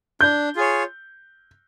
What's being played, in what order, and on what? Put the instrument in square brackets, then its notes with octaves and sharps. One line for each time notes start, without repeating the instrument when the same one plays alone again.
[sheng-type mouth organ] D4 [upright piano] G6
[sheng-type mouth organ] F4 G#4 C#5